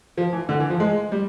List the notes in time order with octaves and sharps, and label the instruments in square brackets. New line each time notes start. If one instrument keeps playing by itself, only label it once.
[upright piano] F3
E3
D3
E3
F3
G#3
G3